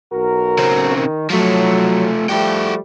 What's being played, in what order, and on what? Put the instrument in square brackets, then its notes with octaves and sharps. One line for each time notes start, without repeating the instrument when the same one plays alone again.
[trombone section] B1 F#4 A#4
[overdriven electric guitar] C#3 C4
[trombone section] D#3
[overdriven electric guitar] F3 A3 [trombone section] F#3
[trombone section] F3 G3 A3 [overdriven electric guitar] F#4 G5